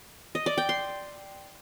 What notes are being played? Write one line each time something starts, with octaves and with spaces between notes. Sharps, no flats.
D#5
D5
G5
C6